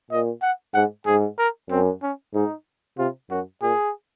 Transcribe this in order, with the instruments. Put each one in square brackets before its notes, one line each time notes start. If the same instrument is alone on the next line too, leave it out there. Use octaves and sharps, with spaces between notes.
[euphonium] A#2 [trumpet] D#5
[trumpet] F#5
[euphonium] G#2 [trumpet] F#5
[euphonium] G#2 [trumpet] G#4
[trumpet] A#4
[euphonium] F#2 [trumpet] C4
[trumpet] C#4
[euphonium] G#2 [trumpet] D#4
[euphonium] C3 [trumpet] F4
[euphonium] F#2 [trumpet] F#4
[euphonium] A#2 [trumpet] G#4